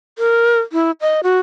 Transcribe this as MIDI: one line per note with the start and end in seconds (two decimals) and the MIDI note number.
0.19 0.59 70
0.72 0.91 64
1.01 1.21 75
1.23 1.40 66